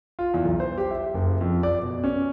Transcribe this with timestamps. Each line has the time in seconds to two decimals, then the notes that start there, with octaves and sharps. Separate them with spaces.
0.19 F4
0.34 E2
0.45 B1
0.60 C5
0.78 G4
0.91 E5
1.14 F#1
1.41 F2
1.63 D5
1.82 B2
2.04 C#4